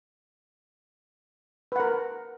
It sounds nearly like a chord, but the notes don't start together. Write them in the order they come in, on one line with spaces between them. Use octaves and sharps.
B4 F#5 A#4